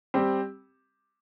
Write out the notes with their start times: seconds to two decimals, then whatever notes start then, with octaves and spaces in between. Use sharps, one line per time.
0.14 G3 C4 G4